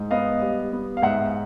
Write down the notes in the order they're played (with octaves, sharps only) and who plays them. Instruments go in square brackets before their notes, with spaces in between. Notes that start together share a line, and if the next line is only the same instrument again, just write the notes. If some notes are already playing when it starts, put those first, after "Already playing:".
Already playing: [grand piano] G#2
B3 D#5 F5
G3
B3
F5
G#2 E5 F#5